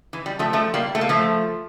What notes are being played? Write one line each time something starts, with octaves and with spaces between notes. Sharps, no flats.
E3
G3
F3 A3
F3 A3
G3 A#3
A3
A#3
F3 A3